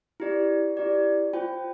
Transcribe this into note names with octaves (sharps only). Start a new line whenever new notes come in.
E4 G4 D5
E4 G4 D5
F4 C5 G5